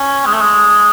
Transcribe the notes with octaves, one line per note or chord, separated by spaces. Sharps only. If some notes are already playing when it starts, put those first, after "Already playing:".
Already playing: C#4
G#3
A3
G#3